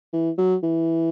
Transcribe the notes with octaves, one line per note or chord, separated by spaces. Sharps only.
E3
F#3
E3